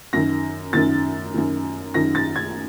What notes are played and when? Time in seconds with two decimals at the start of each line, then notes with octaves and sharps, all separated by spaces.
0.13 F#2 D#3 A#6
0.73 F#2 D#3 A6
1.34 F#2 D#3
1.94 F#2 D#3 A#6
2.15 A6
2.36 G#6